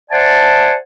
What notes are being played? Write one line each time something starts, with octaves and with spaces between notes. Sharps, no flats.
C5 D5 E5 F#5 G#5 A5